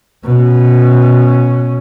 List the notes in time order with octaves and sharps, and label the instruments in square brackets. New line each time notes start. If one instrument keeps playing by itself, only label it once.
[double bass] B2 C#4